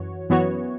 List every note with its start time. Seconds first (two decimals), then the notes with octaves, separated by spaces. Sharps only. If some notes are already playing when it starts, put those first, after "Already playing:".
Already playing: F#2 E3 F#4 C#5
0.30 F#2 E3 B3 F#4 C#5